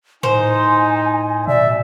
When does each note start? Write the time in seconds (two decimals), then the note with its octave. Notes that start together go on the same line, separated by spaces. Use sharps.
0.23 A2 D#4 C5 G#5
1.47 B2 D5 E5